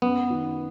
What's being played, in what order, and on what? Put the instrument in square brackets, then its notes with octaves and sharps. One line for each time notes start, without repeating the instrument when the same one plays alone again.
[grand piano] F#2 [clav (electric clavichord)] B3
[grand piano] D#3